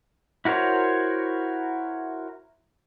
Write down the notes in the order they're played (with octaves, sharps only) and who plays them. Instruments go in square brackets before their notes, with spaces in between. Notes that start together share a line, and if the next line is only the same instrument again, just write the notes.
[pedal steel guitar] E4 F#4 A#4 C5 C#5